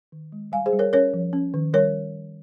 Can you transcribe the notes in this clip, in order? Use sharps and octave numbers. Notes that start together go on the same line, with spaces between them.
D#3
G#3
G3 F5 G#5
G#4 C5
G3
A#4 C#5
C#4 A#4 C#5
F3
C#4
D#3
G3 A#4 C#5